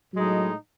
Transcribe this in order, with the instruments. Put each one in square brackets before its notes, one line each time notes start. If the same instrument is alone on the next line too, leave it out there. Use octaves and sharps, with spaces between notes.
[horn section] A2 G#3 D#4 [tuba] F#3